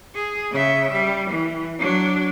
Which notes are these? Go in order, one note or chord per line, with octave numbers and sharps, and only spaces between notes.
G#4
C#3 E5
G3
E3
F#3 D4